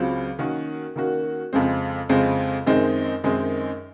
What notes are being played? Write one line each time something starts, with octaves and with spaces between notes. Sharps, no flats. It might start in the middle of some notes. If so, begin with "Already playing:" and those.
Already playing: C#2 C#3 F#3 C4 F4
D#3 A#3 C#4 F#4
D#3 A#3 C#4 F#4
F2 C#3 G#3 C4
F2 C#3 G#3 C4
F#2 D#3 G#3 C4 D#4
F#2 D#3 G#3 C4 D#4